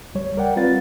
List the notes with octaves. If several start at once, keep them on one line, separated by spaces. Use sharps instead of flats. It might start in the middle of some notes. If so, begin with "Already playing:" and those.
C#2 G3 C#5
A#4 D5 F#5 G5
G3 C4 F4 B4 F5 A6